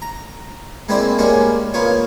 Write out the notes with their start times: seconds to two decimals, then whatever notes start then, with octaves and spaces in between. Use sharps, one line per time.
0.02 A#5
0.89 G#3 A#3 C4 E4 C5 D5
1.18 G#3 A#3 C#4 D4 G4 A#4
1.74 A#3 B3 F4 C#5